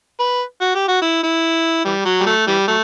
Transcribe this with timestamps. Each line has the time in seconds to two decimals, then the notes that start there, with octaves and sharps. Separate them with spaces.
0.20 B4
0.61 F#4
0.75 G4
0.88 F#4
1.02 E4
1.23 E4
1.85 E3 G3
2.05 F#3
2.20 G3
2.26 F#3 A3
2.47 E3 G3
2.68 F#3 A3